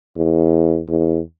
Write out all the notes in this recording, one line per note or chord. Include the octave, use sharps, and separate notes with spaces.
E2
E2